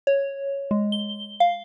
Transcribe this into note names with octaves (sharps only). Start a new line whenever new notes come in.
C#5
G#3
G7
F5